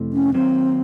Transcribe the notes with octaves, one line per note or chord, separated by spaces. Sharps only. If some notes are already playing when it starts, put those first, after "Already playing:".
Already playing: F2 C3 E3 A3
C#4
D#3 F#3 A#3 C4